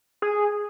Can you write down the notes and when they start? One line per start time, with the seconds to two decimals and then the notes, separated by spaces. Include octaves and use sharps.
0.22 G#4